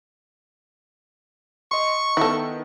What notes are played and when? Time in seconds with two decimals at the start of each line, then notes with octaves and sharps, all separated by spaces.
1.71 D#5 C6 C#6
2.17 D#3 B3 E4 A4